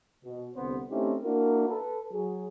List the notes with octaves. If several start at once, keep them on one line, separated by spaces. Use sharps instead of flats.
B2
C2 D3 B3 C4 C5
A3 C4 C#4 D#4 E4 G4
A#3 D4 E4 F#4 A#4
A4 B4
F#3 G#4